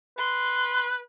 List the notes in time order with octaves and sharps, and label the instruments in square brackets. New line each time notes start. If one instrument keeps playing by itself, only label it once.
[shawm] B4 [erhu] C6